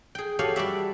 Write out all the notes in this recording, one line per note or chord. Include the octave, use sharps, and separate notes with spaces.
G#4 G5
F#4 G4 A4 C#5 F5 G#5
G3 F#4 D5 E5